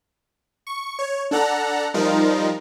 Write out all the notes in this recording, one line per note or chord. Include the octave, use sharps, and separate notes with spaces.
C#6
C#5
D4 A4 F#5 A#5
F3 G3 D#4 F4 A#4